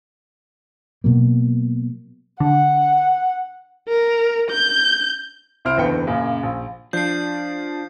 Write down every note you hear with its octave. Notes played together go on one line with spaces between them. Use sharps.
B2 F#3 A#3
D3 F#5
A#4
G6
C2 E4 C5 F6 D7
F#1 E2 D3 B3 G5 C#7
F#2 A#2 C#3
A#1
F3 D4 G6 C7